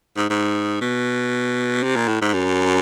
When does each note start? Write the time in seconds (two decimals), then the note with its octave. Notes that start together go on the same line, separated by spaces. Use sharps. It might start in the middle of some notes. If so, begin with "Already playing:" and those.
0.17 G#2
0.30 G#2
0.81 B2
1.83 C3
1.96 A#2
2.08 A2
2.21 G#2
2.34 F#2